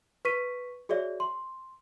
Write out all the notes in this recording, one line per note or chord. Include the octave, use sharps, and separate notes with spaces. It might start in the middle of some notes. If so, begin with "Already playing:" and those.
B4 C#6 B6 D#7
F#4 G#4 C#5 D5 E5
C6